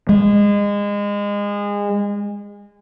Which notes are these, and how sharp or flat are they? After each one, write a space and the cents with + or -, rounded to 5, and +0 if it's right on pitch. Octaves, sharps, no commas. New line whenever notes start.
G#3 -25